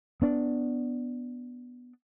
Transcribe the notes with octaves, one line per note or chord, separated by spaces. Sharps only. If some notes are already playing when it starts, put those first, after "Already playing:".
B3 D4